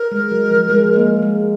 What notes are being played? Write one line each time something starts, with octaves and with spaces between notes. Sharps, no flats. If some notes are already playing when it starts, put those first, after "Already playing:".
Already playing: A#4
G#3
F#3
F3
G#3
A#3
G#3